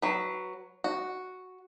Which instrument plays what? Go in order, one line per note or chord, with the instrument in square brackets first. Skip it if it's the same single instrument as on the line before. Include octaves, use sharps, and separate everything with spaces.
[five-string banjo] F#3 B4
F#4